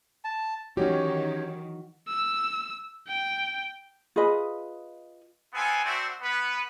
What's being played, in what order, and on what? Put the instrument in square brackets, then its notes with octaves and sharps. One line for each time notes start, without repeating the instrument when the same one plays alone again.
[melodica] A5
[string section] D#3 [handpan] E3 F#4 [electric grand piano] C#4 G4 [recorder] C#5
[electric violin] E6
G5
[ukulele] F4 G#4 B4 D#5
[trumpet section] B3 C4 F4 A4 G#5
A3 C4 F#4 C5 D5 E5
B3 B4